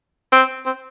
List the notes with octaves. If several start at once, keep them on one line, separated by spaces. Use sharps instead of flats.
C4
C4